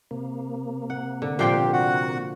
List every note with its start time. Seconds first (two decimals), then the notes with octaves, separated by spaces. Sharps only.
0.11 C3 A#3
0.90 F#5
1.22 D3
1.39 A#2 F3 D4 G4 C5 D5 G5
1.73 F#4 F#5